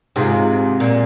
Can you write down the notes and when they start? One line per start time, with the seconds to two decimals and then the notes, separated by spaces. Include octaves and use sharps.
0.16 G#2 C3 G#3 F4
0.80 A#2